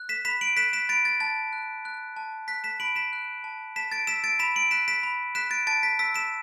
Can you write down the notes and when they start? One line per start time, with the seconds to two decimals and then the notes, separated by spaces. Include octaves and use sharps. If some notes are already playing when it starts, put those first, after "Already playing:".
Already playing: F#6
0.09 B6 E7
0.25 B5 B6 E7
0.41 D7 F#7
0.57 F#6 B6 E7
0.73 B6 E7
0.89 B5 A6 D7
1.05 A6
1.20 A5 A6
1.53 F#6
1.85 F#6
2.17 A5
2.48 F#6 B6
2.64 B6 E7
2.80 B5 D7 F#7
2.96 B6 E7
3.13 F#6
3.44 A5
3.76 A5 B6 E7
3.92 A6 D7
4.07 E6 B6 E7
4.24 A6 D7
4.39 B5 B6 E7
4.56 D7 F#7
4.71 F#6 B6 E7
4.88 B6 E7
5.03 B5
5.35 F#6 B6 E7
5.51 A6 D7
5.67 A5 A6 D7
5.83 B6
5.99 E6 B6
6.14 B6 E7